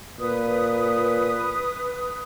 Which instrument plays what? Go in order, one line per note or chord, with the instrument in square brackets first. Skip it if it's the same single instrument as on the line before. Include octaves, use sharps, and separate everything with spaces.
[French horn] A#2 [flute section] B4 D#6